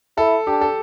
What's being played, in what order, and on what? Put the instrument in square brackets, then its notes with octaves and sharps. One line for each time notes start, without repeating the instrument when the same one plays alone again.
[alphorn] E4 [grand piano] A4
[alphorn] D4 [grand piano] G4
[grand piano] A4